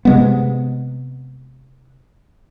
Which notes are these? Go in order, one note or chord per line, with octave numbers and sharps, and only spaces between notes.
C3 G#3 B3